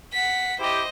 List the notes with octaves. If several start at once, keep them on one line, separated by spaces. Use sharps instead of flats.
F#5 B6
E4 G4 C5 D#5